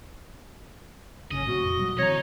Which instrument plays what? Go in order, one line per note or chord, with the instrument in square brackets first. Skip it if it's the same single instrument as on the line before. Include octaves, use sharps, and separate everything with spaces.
[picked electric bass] G#1 F#2 C#3 [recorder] C#4 [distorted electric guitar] D#5
[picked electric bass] A2 A3 C4 [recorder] F#4
[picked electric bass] F1
B2 F#3 G3
[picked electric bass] D3 E3 C4 [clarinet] C#5 [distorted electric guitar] D#5 A#5